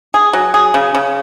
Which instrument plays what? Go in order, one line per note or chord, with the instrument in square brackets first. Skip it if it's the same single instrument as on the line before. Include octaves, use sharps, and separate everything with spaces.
[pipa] G#4
F#3
G#4
C#3
C#3